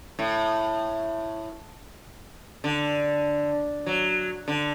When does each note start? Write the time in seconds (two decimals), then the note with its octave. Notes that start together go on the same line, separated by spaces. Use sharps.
0.19 A2
2.64 D3
3.86 F#3
4.48 D3